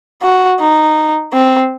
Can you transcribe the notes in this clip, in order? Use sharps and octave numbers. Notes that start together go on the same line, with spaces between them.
F#4
D#4
C4